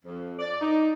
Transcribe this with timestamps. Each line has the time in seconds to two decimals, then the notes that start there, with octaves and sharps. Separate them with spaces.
0.04 F2
0.39 D5
0.60 D#4